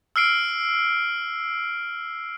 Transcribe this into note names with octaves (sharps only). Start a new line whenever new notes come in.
E6 F6 C7 D7